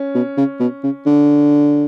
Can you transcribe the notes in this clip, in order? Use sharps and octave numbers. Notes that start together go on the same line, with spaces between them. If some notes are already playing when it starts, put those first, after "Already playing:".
Already playing: C#4
B2
C#3
B2
C#3
D3